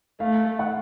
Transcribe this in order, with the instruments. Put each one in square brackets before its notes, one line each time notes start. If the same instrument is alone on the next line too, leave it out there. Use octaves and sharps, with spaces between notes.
[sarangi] A3 [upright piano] F5
[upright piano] F#5